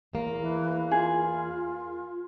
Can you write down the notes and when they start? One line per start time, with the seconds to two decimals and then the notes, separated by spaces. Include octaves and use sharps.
0.13 E2 A#3
0.40 E3
0.91 F4 G#4